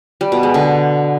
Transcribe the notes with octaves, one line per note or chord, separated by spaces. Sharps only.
G3
B2
G#3
D3